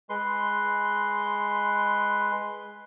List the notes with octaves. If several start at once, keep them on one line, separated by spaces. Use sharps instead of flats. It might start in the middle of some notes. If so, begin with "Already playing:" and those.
G#3 B4 C6